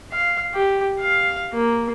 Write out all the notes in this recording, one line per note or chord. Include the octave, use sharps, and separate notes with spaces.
F5
G4
F5
A#3